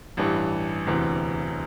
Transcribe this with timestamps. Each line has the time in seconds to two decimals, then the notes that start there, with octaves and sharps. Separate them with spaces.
0.17 A1 G2 E3 G3
0.87 E1 D2 C3 E3